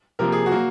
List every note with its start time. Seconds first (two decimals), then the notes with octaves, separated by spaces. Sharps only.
0.19 C3 F3 A#3 A#4
0.32 G#4
0.46 F#4
0.51 F#3 A#3